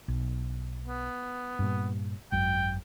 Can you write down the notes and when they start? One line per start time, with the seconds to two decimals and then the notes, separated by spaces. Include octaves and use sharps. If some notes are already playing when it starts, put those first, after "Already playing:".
0.08 B1
0.86 B3
1.59 G2 A#2
2.32 G#1 F#2 G5